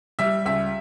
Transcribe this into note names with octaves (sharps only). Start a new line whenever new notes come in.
G3 E5
C#2 E5